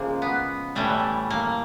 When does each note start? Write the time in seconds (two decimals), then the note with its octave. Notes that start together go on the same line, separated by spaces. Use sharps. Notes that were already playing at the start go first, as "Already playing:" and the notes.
Already playing: C#3 F3 G#3 A#3
0.22 B3
0.75 A2 E3 G3 A3
1.30 A#3